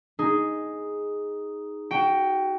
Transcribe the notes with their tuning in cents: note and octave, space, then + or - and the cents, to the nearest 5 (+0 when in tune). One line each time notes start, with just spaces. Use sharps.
D#4 +0 G#4 +0
F#4 +25 G5 +0